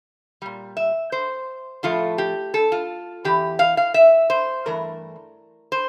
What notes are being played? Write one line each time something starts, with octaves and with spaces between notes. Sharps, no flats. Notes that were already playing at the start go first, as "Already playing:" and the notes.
A#2 G3
E5
C5
A2 F3 A3 F4
G4
A4
F4
E2 E3 G4
F5
F5
E5
C5
G2 E3 A3 A#4
C5